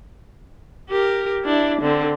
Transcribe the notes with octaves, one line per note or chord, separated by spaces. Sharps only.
G4 A#4
D4 E4
D3 C4